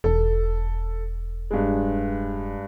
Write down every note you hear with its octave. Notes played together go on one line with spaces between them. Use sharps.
E1 A4
G2 G#3